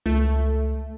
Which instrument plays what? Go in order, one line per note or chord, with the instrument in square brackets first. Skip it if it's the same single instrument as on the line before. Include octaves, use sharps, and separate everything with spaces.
[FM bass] C#2 [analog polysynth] A3